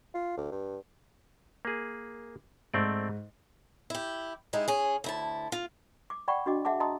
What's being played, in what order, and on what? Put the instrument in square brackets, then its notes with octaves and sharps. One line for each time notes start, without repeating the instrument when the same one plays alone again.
[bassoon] F4
D2
G2
[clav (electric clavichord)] A#3 G#4
[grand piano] G#2 [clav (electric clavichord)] A3 C4 D5
[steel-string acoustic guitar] E4 G4
G#3 D#4 E4 G4
C#4 G#4
D2 E4 A5
F4
[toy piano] D6
D5 F#5 G5 B5 C#6
D4 F#4 D#5 D6
G#4 E5 F#5 A5 D6
D#5 A5 A#5 C6 D#6